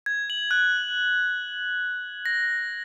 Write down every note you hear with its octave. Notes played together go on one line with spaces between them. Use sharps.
G#6
F#7
F#6
A#6